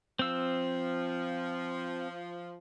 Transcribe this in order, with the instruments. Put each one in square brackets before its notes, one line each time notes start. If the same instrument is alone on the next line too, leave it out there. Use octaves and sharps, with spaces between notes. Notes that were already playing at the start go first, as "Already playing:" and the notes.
[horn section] F3 [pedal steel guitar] C4 E6